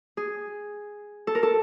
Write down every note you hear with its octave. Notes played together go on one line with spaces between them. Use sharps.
G#4
A4
A#4
A4